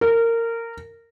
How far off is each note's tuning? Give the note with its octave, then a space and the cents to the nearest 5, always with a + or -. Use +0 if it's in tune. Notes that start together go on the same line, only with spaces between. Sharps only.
A#4 -20